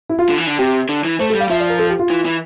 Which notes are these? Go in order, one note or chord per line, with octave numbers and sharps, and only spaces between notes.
E4
F4
D3
E3
D3
C3 G4
D3
E3
A3 C5
A4
G3
F5
F3 E5
D5
A#4
A4
G4
F4
E3
E3